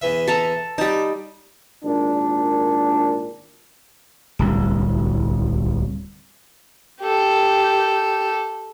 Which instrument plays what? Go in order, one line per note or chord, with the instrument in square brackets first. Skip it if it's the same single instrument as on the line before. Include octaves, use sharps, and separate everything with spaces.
[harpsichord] E2 E3 E5
[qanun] A4 A5 A#5
[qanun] G3 D#4 [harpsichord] D5 A5
[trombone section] G#1 A#2 D4
[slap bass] D1 C2
[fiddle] G4 A4